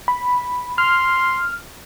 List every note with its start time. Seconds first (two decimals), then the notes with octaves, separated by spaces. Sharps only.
0.08 B5
0.78 C6 F6